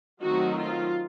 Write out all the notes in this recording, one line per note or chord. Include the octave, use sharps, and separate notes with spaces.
D#3 F#3 A3 C4 D#4 F#4
F4